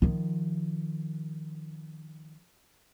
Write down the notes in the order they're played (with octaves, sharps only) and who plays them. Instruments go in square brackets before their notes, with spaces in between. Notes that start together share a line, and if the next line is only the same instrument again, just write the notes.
[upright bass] D#3 F3